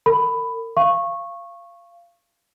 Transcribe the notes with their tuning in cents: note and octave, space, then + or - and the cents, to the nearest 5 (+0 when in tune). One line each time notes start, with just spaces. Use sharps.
A#4 -40 B5 +10
F5 -20 C#6 -15